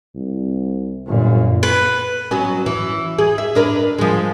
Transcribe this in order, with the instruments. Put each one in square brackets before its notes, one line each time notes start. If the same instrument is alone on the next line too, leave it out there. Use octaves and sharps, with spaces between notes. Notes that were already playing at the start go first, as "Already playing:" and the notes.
[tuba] C2
[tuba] G1 [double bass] F#2 A#2
[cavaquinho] B4
[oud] F#3 B3 C#4
E3
G#4
E5
D4 A#4 B4
F3 G#3